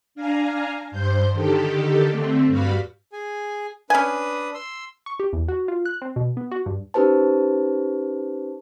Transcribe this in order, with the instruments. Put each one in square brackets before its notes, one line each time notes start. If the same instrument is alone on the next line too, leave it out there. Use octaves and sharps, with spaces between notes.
[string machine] D4 F5 G#5 A#5
G2 C5 G6
D3 D#3 G4 A4
D3 A3 C4
G2 G3 F#4 F5 B5
[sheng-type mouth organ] G#4 G#5
[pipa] C#4 G#5 [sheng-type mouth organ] D4 B4 D#6
[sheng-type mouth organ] C6 E6
[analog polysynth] C#6
G4
E2
F#4
F4
F#6
C4
B2
B3
F#4
G2
[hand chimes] C#4 D#4 G4 B4 C5 A5